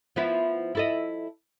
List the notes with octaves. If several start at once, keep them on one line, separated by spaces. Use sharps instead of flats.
F3 B3 E4
E4 A4 D#5